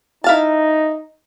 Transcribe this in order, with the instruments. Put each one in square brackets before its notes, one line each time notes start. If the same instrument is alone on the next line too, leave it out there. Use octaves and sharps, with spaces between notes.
[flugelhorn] D#4 [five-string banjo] E4 F5 A5